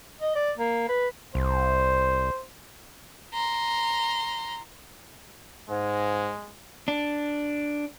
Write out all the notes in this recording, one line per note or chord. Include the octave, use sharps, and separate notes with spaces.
D#5
D5
A#3
B4
C2 C5
A#5 C6
G#2 G#3
D4